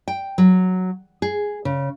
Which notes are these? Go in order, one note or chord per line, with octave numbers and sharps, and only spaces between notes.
G5
F#3
G#4
C#3